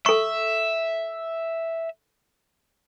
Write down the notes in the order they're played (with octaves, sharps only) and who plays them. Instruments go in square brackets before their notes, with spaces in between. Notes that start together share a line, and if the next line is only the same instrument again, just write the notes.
[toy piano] A4 C#6 [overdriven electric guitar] E5